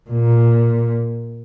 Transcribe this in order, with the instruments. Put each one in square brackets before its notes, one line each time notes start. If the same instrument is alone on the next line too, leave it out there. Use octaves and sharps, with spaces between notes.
[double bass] A#2